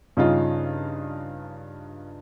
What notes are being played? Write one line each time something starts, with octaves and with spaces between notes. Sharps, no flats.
G2 C#3 D#4 F4